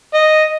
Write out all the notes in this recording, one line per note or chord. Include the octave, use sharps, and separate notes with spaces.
D#5